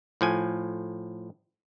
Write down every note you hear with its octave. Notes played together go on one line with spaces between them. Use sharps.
A2 F3 G#5